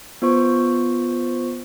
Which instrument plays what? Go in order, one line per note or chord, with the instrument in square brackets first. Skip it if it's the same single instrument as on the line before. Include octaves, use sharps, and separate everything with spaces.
[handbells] B3 F4 C5 C#6